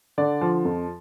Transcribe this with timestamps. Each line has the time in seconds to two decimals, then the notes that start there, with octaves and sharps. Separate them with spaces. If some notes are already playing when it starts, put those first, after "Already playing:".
0.18 D3 D5
0.41 F3
0.65 F2